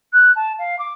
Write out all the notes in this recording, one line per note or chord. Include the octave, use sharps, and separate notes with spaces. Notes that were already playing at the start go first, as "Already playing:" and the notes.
F#6
A5
F5
D6